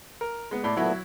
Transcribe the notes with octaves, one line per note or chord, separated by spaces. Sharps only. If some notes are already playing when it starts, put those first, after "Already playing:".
A#4
G#3 B3
A2 D5
A#2 F#3 A3 B3 E4